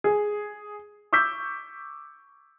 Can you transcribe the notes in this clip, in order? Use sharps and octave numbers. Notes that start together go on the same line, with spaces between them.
G#4
C#6 D6 E6 G6 B6